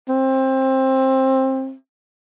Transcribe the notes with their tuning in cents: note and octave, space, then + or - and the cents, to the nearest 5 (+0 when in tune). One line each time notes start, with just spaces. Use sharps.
C4 +20